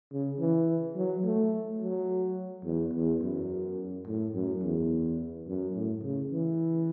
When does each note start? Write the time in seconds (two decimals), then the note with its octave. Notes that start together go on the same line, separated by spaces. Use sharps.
0.12 C#3
0.39 E3
0.96 F#3
1.24 A3
1.81 F#3
2.65 E2
2.94 E2
3.21 F#2
4.07 A2
4.34 F#2
4.62 E2
5.47 F#2
5.75 A2
6.03 C#3
6.31 E3